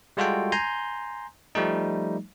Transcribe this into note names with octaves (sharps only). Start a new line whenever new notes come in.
G3 G#3 F4 F#4 A4 G5
G#5 A#5 C6 G6
F3 G3 A3 D#4